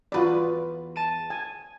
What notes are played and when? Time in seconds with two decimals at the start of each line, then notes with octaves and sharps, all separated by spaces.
0.12 E2 F4 F#4 B4 D5
0.96 A5 D#7
1.30 G#5